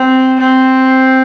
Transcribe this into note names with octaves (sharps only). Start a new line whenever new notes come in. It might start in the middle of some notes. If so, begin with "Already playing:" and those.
Already playing: C4
C4